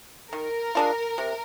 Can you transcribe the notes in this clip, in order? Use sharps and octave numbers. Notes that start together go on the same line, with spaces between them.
D#3 A#4
G#3 D4 F4
C3